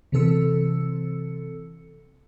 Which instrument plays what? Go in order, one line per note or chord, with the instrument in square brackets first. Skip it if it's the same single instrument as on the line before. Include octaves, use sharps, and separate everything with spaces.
[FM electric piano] C3 E3 C4 A4 E6 C#7